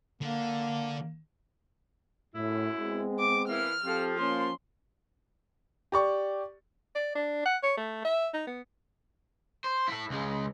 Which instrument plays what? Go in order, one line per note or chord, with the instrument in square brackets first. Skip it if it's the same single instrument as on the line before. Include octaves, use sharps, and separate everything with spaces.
[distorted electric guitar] D3 [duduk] A#3
[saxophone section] F#2 E4 [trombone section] A2
[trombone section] G#3 B3 C4
[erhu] D6
[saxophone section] E3 A#3 E4 [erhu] F6
[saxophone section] F3 [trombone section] C4 G4 A4
[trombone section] A#3 C#4 [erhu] C6
[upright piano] G4 D5 C#6
[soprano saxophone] D5
D4
F#5
C#5
A3
E5
D#4
B3
[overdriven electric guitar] C5
E4 A4
C#2 G#3